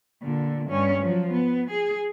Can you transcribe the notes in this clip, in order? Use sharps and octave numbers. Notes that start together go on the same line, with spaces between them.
A#2 D3
G2 C#4
F3 F#3
B3
G#4